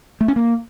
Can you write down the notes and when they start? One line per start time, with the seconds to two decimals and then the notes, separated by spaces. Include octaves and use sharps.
0.21 A3
0.28 C#4
0.36 A#3